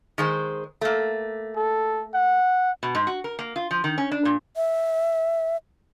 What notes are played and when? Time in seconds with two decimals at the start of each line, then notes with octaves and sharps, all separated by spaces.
0.18 D#3 G#3 C5
0.81 A3 A#3
1.56 A4
2.14 F#5
2.83 B2
2.95 G#2
3.07 F#4
3.24 A#4
3.39 A#3
3.56 F4
3.71 F3
3.84 D#3
3.98 C#4
4.11 D4
4.25 A#2
4.56 E5